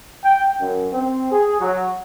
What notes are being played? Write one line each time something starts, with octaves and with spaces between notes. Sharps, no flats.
G5
F#2
C4
G#4
F#3